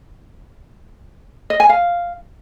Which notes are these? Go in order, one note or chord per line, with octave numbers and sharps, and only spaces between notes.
D#5
G#5
F5